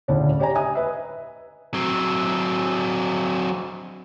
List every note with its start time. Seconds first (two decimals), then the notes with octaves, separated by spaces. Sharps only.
0.08 D2 A2 C#3 D4 C#5
0.39 G4 C#5 D5 G#5 A#5
0.55 D#5 E5 G#5 D#6
0.75 B4 E5
1.74 F#3 C4